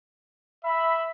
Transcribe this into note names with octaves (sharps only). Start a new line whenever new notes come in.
E5 B5